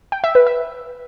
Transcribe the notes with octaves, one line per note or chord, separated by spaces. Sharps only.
G5
E5
B4
E5